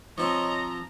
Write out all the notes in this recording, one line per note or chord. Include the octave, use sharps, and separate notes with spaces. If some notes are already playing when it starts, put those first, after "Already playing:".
F3 C4 C#5 D#5 A#5